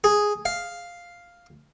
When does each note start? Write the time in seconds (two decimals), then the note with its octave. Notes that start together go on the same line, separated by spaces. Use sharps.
0.04 G#4
0.45 F5